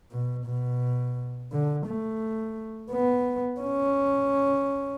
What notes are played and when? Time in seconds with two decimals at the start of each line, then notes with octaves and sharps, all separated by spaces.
0.12 B2
0.46 B2
1.52 D3
1.87 A3
2.92 B3
3.61 C#4